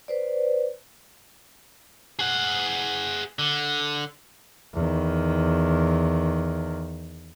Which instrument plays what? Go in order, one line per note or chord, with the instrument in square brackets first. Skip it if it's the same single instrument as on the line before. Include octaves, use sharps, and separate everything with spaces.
[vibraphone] B4 C5 D5
[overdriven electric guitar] G#4 F#5
D3
[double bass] E2 D#3